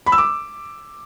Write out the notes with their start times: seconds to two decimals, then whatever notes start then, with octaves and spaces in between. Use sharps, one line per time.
0.06 B5
0.12 E6
0.18 D6